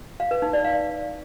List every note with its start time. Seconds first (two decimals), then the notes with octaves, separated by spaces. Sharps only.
0.20 F5
0.31 B4
0.42 D#4
0.53 D5
0.65 F5